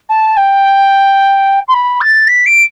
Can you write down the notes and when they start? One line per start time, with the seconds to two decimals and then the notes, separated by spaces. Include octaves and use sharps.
0.09 A5
0.37 G5
1.68 C6
1.73 B5
2.01 A6
2.28 B6
2.46 D7